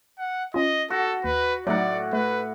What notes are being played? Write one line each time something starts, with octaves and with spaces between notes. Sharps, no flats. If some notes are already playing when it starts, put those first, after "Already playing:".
F#5
C#4 F4 D#5
F#4 A4
D#2 B4
A2 F#3 A3 D#4 D5 F#5
A3 B4